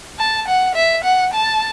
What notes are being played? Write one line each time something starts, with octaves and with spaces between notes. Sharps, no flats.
A5
F#5
E5
F#5
A5